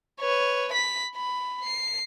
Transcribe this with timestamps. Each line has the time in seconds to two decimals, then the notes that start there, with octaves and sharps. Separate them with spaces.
0.20 B4 C#5
0.73 B5 B6
1.16 B5
1.64 C7